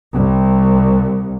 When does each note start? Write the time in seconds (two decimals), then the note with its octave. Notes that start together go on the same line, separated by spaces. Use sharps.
0.14 C2